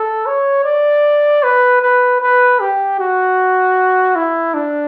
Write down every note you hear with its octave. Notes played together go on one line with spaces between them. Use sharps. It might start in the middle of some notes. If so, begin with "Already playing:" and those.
Already playing: A4
C#5
D5
B4
B4
B4
G4
F#4
E4
D4